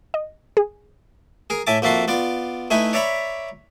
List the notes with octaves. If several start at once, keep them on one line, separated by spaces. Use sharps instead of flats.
D#5
G#4
G#4 A#4
A2 E5 G#5 A5 D6
F2 A#3 F#4 E5 A5 C6
B3 F4 D5
A3 D#4 E4 B4 G#5
C#5 D5 E5 A#5 B5